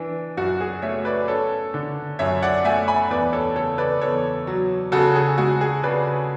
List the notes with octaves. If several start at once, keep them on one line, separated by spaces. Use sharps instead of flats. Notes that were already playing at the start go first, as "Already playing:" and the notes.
Already playing: E3 D4
F#2 F#4
G#4
A3 C#5 E5
B4 D5
C#4 A4 C#5
D3
F#2 C#5 E5
D5 F#5
A3 E5 G#5
G#5 B5
E2 B4 D5
A4 C#5
C#3 A4 C#5
B4 D5
E2 A4 C#5
F#3
C#3 F#4 A4
G#4
G#3 F#4
G#4
C#3 B4 D5